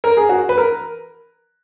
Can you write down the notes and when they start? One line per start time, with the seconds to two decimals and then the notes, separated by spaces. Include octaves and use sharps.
0.04 A#4
0.17 G#4
0.29 F#4
0.49 B4
0.58 A#4